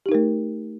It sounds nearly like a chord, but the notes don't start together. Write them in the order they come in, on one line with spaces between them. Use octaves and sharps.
G4 D#4 A#4 A3